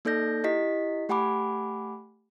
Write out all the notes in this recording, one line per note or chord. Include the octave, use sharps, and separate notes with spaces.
A#3 D#4 A4 D5 G6 A#6
E4 G4 D#5 B6
A3 G4 F#5 G#5 B5 D6